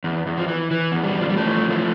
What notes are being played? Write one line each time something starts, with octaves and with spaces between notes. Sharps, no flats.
E2
E2
F3
E3
E3
E2
G3
E2
F3
G3
E3 F3 A3
E2
F3 A3